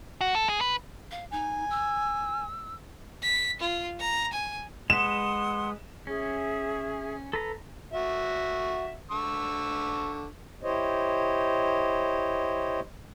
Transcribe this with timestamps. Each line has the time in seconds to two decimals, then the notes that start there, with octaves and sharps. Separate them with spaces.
0.21 F#4
0.35 A4
0.49 G#4
0.61 B4
1.11 F5
1.31 D#4 G#5
1.70 E6
3.23 B6
3.60 F4
4.00 A#5
4.33 G#5
4.90 G#3 B4 F#5 C6 D#6 E7
6.07 C#4 G#4 E5
7.33 A4 B4 A#5
7.94 F#4 E5
9.11 D3 C#6 E6
10.63 E4 G4 C5 C#5 D#5